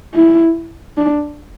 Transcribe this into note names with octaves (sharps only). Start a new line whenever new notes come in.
E4
D4